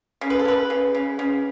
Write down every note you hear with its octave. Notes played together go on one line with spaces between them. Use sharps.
C#3
B4
A4
C#3 B4
C#3
C#3
C#3